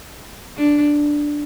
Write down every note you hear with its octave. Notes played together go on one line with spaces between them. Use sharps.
D4